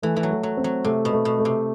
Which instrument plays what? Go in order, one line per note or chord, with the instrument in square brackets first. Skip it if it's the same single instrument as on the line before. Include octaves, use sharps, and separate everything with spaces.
[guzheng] E3 [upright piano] A3
[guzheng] E3
F#3
[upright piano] A3
[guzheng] F#3
[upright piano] C4
[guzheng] F#3
[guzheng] C3 [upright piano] A3
[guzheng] B2
[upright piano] A3
[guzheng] B2
[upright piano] A3
[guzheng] C3